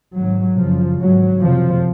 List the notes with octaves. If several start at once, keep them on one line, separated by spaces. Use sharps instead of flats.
G#1 G#2 F#3
F#1 F#2 C#3 F3
G#1 G#2 F#3
F#1 F2 C3 F3